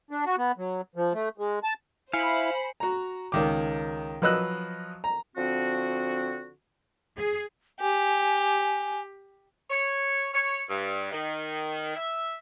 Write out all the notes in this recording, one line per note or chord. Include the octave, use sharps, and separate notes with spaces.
D4
F#4
B3
F#3
F3
A3
G#3
A5
E4 C5 F5 G#5 B5 C7 C#7
F#4 A#5
C#2 D#3 D6
F3 F#3 B4 D#5 E6 F#6
A#5
D3 F3 C4 F#4
G#4
G4 G#5
C#5
C#5
G2
D#3
E5